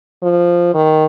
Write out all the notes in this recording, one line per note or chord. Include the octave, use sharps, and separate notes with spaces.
F3
D#3